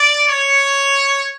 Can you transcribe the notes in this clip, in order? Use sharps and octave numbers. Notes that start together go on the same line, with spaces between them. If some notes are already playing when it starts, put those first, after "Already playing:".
Already playing: D5
C#5